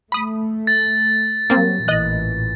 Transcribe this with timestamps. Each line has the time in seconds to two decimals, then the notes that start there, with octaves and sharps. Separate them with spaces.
0.12 A3 B5 D#6
0.67 A6
1.50 F#3 G3 A#3 C4
1.88 A1 A#2 E3 D#5 F#6